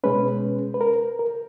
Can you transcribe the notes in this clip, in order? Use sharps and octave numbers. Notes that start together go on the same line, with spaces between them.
B2 G#3 C#4 B4
B4
A#4
A#4